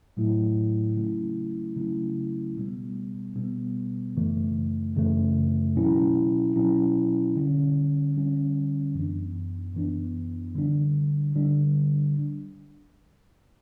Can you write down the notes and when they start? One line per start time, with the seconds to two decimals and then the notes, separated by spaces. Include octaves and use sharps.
0.17 A2 F#3 A3 E4
0.97 C#3 F#3 A3 C#4 E4
1.76 C#3 F#3 A3 C#4 E4
2.57 B2 G3 B3
3.36 B2 G3 B3
4.16 F#2 C#3 E3 A3
4.96 F#2 C#3 E3 A3
5.76 B2 F#3 C#4 E4
6.56 B2 F#3 C#4 E4
7.36 D3 G3 C#4
8.16 D3 G3 C#4
8.95 F#2 E3 B3 D4
9.74 F#2 E3 B3 D4
10.55 D3 G3 D4
11.35 D3 G3 D4